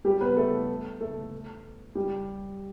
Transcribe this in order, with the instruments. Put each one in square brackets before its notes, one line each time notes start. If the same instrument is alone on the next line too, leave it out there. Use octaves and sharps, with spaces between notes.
[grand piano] G3 G4
B3 B4
A3 A4
A3 A4
G3 G4